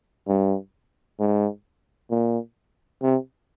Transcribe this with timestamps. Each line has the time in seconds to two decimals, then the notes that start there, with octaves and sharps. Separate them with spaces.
0.28 G2
1.20 G#2
2.11 A#2
3.02 C3